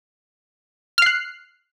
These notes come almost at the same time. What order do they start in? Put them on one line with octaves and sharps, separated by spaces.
F6 C7 F#6